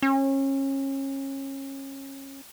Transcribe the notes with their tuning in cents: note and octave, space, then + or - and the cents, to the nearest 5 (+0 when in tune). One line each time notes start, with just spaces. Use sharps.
C#4 -30